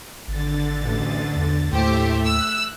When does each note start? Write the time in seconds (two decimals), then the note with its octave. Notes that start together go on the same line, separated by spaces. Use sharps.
0.27 G#1 D3 A6
0.82 A1 D2
1.36 E2
1.72 D#2 A2 A3 G4 C5 E5
2.26 E6 F#6